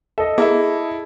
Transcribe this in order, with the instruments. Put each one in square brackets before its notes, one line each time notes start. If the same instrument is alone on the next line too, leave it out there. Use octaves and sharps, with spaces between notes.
[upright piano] A4 D#5 [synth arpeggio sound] E5
[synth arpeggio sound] B3 A#4 E5 [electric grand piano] E4 [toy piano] G#4